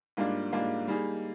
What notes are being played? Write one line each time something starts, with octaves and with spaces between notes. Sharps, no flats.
G#2 G3 A#3 D4 F4
G#2 G3 A#3 D4 F4
G3 A#3 D#4 G#4